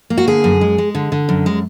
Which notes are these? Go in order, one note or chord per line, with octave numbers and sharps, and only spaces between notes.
A#3
F#4
D3 G#4
F#2
G#3
G#3
D3
D3
F#2
G#3